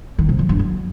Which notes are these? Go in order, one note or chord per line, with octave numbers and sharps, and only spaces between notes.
D#3
C3
F3
G2
F#2